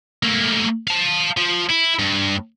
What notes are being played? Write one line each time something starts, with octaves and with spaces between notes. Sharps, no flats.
A3 A#3
F5 A5
F3
E4
G2